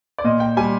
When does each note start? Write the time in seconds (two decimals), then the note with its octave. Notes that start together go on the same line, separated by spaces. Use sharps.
0.18 D5
0.24 A#2 D#5
0.40 G5
0.57 G3 G#5